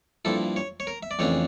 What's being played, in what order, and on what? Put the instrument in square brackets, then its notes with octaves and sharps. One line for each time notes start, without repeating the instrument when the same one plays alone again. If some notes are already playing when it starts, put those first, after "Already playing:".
[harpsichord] G2 F3 A#3 E4 A4
C#5
C#5
A#4
E5
D5
F2 C#3 E3 A3 D4 C#5